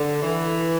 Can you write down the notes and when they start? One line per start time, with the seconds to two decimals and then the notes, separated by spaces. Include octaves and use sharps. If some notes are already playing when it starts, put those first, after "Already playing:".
Already playing: D3
0.23 E3